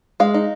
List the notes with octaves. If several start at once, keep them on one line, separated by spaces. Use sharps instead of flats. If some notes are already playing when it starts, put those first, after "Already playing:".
G#3 F5
D#4